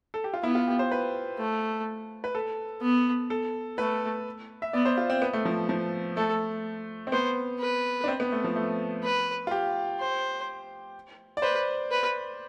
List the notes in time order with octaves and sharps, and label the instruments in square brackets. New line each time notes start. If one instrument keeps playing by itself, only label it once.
[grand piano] A4
G4
F4
[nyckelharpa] B3 [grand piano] E4
[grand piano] F4
G4
C5
B4
[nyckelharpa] A3
[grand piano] B4
A4
[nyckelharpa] B3
[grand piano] A4
[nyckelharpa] A3 [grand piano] B4
[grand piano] E5
[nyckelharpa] B3 [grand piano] D5
[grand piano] C5
F4
C4
B3
A3
F3
F3
[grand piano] A3 [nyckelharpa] A4
[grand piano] C4
[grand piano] B3 [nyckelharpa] C5
[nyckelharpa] B4
[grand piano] D4
C4
B3
A3
F3
A3
[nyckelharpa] B4
[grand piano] F4
G4
[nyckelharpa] C5
[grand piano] D5
[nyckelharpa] B4 [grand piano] C5
[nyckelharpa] B4